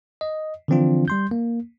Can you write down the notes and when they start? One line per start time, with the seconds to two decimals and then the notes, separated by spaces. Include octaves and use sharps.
0.21 D#5
0.68 D3 E3 F3 C4 D4 F4
1.08 G3 C6 G6
1.31 A#3